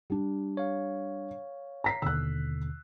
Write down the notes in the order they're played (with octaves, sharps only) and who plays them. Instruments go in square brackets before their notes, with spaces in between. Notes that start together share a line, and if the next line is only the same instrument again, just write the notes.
[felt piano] G3 D4
[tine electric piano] C#5 F5
[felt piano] A#5 B6 C7
[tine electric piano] D#2 B2 D3 [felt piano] E6 F#6